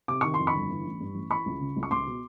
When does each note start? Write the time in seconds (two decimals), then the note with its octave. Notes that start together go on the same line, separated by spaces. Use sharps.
0.08 C3 D6
0.21 D#3 C#6
0.34 C6
0.39 F2
0.47 B5 C#6
0.54 G1
0.70 E3
0.85 A1
1.00 G2
1.15 A1
1.31 E3 B5 C#6
1.46 C#2
1.60 C#3
1.76 C#2
1.83 C#6
1.91 C#2 C6 D6
2.06 B2